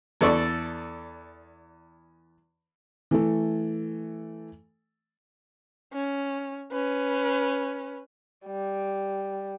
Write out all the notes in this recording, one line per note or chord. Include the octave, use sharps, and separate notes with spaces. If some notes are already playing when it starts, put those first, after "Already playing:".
E2 A4 D5 C#6
E3 A3 A4
C#4
C#4 B4
G3